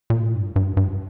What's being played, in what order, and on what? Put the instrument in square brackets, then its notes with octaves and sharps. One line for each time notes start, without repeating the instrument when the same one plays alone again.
[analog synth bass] A#2
A2
G2
G2
G2